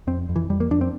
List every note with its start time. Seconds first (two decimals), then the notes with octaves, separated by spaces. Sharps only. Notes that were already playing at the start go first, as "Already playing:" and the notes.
0.07 F2 C4
0.29 F2
0.36 E3
0.49 F2 G3
0.60 A#3
0.71 F2 D4
0.81 C4